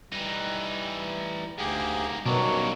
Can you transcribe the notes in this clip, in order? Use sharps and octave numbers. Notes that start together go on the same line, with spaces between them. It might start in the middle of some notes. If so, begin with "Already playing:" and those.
E3 G3 D#4
D2 G#2 A#3 G4 G#4
F#2 B2 D#3 F#3 G3 A#3 D4